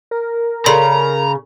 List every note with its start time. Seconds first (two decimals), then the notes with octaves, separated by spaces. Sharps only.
0.11 A#4
0.66 C#3 A4 D5 A#5 C6